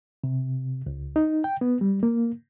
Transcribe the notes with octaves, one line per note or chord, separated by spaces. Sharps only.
C3
C#2
D#4
G5
B3
G3
A#3